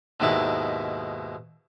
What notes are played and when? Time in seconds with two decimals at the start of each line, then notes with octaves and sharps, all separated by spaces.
0.20 D#2 G#2 B2 D#3 E4 A5